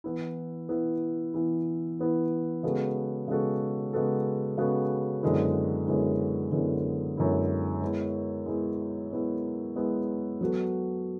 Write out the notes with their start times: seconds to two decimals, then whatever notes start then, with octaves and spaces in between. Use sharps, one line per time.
0.04 E3 B3 E4
0.69 E3 B3 E4
1.34 E3 B3 E4
1.99 E3 B3 E4
2.63 C#3 G#3 B3 F#4 A4
3.28 C#3 G#3 B3 F#4 A4
3.93 C#3 G#3 B3 F#4 A4
4.58 C#3 G#3 B3 F#4 A4
5.22 F#2 D3 G#3 B3 E4
5.87 F#2 D3 G#3 B3 E4
6.52 F#2 D3 G#3 B3 E4
7.17 F#2 D3 G#3 B3 E4
7.82 G#3 B3 E4
8.46 G#3 B3 E4
9.11 G#3 B3 E4
9.76 G#3 B3 E4
10.41 F#3 B3 F#4 A4